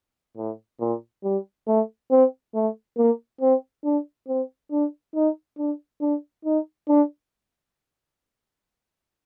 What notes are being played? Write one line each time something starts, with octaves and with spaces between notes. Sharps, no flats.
A2
A#2
G3
A3
C4
A3
A#3
C4
D4
C4
D4
D#4
D4
D4
D#4
D4